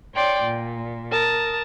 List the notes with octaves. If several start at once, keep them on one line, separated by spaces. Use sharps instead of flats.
C#5 D5 G5 C6
A#2
A#4 A5 D#6